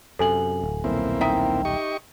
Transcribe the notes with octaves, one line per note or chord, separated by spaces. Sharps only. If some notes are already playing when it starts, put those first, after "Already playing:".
F#2 C3 A4 G#5 F#7
D1
D#1 B1 A#3 C4 E4
D#4 E5 G5
G4 D#5 C#6